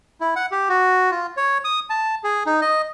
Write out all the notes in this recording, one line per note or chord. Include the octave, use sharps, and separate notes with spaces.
E4
F#5
G4
F#4
F4
C#5
D#6
A5
G#4
D#4
D#5